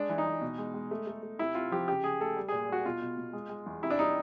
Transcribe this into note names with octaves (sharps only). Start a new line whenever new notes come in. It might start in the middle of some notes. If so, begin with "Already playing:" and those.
Already playing: G#3 D4
E3
D#4
E3
B2
G#3
G#3
A3
A3
A3
C3 E4
C3 F4
F3 G4
C#3 G4
C#3 G#4
A3 A4
G3
G#4
A#2
G3 F#4
B2 F4
B2
B2
G#3
G#3
E2
C3 E4
D4
G3 D#4